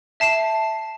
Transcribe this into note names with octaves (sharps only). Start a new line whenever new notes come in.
E5 A5 C7 E7